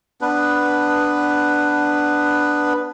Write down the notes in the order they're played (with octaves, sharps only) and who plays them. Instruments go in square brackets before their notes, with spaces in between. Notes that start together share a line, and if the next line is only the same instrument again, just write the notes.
[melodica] B3 D4 B4